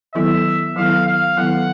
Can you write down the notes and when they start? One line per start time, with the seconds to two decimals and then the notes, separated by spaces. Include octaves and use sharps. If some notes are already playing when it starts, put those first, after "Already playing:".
0.15 D#3 F#3 B3 E4 A4 E5
0.76 D#3 F#3 B3 E4 A4 F5
1.06 F5
1.37 D#3 F#3 B3 E4 A4 F#5